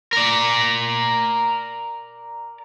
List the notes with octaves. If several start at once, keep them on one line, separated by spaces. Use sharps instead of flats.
A#4 D5